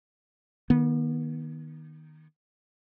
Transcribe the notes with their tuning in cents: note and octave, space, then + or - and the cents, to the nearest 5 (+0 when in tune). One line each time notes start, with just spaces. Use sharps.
D#3 -5 B3 -40